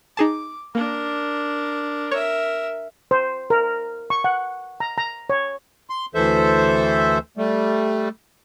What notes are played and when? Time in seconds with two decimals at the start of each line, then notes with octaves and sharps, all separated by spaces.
0.17 D#4 G#4 A5 D6
0.75 A#3 D4 A#4
2.11 A#4 C#5 E5
3.11 C5
3.50 A#4
4.10 C#6
4.24 F#5
4.80 A#5
4.98 A#5
5.30 C#5
5.90 C6
6.15 D2 E3 A4 C5 E5
7.37 G3 A3